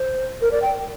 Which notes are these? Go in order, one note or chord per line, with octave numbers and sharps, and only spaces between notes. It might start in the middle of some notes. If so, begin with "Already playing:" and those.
Already playing: C5
A#4
D5
G5